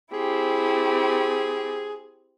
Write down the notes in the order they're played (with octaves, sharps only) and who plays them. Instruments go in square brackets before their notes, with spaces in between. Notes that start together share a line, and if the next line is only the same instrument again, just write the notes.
[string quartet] C4 E4 G4 [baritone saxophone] G#4